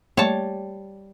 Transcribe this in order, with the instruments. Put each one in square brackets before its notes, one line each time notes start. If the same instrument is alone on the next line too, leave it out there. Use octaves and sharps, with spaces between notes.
[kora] G3 [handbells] A3 A#3 [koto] C#5 A5